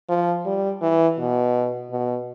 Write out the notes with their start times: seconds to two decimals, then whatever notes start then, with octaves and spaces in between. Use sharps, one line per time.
0.09 F3
0.45 G3
0.82 E3
1.19 B2
1.91 B2